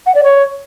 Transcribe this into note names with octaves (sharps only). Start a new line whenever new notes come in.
F#5
D5
C#5